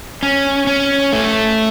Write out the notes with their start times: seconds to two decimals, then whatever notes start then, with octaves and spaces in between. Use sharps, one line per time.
0.23 C#4
0.67 C#4
1.13 A3